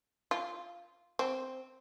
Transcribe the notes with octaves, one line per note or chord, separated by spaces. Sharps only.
F4
C4